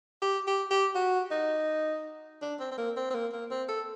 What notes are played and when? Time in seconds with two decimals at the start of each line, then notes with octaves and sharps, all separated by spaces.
0.22 G4
0.47 G4
0.71 G4
0.95 F#4
1.31 D#4
2.42 D4
2.60 C4
2.71 C4
2.78 A#3
2.96 C4
3.10 C4
3.14 A#3
3.33 A#3
3.51 C4
3.69 A4